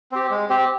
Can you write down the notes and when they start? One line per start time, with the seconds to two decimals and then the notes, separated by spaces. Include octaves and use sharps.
0.12 C4 G4
0.30 G#3
0.49 C4 G4